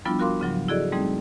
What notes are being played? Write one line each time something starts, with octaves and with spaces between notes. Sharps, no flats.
F3 G3 B3 D4 E4 F4
F4 F#4 A#4 F5 C6 D6
G#2 C#3 F3 F#3
E4 F#4 G#4 A4 D5 D#5
G3 A3 C4 D#4 G#4